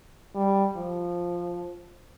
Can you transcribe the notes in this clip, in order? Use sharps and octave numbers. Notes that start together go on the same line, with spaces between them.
G3
F3